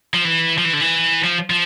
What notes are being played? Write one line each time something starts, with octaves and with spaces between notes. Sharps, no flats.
F3
E3
F3
E3
D3
E3
F3
F3